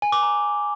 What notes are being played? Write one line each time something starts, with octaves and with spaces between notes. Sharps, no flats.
G#5
D6
A#5